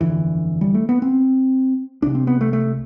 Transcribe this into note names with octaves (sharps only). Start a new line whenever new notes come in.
G1 F2 D3 E3
G3
A3
B3
C4
C2 C3 D4
C4
B3
A3
A3